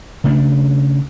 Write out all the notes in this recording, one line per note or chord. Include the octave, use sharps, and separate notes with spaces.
C#3 A3 D4